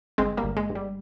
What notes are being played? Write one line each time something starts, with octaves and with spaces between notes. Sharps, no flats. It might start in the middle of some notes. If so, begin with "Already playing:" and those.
G1 G#3 C4
G3 A#3
G1
G#3
G2
G3